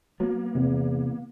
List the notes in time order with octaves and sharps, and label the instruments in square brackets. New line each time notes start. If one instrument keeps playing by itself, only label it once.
[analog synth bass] F#3 [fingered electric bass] A#3 B3
[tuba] E2 [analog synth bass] C3